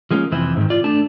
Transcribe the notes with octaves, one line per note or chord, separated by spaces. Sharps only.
F3 G#3 A#3 C#4
F2 C3 E3 C4 E4
G#2 D#3
F4 D5
A3 D4 A5